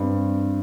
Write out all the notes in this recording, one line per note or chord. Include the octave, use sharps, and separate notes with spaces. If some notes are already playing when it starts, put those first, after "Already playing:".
Already playing: G2 C4